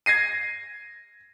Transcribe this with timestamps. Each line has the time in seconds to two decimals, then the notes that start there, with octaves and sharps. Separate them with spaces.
0.06 G#6 A#6 C7 D#7